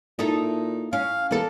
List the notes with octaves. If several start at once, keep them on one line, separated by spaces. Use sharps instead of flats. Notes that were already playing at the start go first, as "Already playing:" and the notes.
A#2 D#4 E4 A4
C#4 F5
E2 A#3 A4